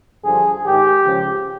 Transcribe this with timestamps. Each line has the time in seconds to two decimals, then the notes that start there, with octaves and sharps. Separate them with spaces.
0.25 G2 D3 F3 G#4
0.65 G#2 D#3 G4
1.05 C#2 C#3 F3